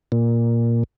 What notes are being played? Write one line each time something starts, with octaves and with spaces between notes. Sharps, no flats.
A#2